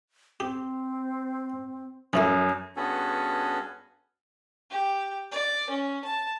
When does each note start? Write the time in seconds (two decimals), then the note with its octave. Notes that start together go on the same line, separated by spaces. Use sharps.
0.40 C4 G4
2.13 F#2 E3 F3 A3
2.76 G2 B3 C#4 F#4 G#4 A4
4.70 G4
5.32 D5
5.70 C#4
6.05 A5